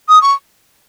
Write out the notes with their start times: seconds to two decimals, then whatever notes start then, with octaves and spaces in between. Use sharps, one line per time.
0.09 D#6
0.22 C#6